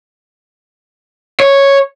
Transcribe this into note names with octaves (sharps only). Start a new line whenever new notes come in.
C#5